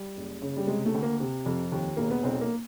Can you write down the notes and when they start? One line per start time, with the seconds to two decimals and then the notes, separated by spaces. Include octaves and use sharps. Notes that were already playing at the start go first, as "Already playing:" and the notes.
Already playing: G3
0.17 F#1
0.42 C#3
0.57 G3
0.67 C3 G#3
0.86 A3
0.95 D2
1.03 A#3
1.20 C3
1.46 F2
1.72 D#2
1.97 E1 A#3
2.10 B3
2.23 B1 C4
2.41 A#3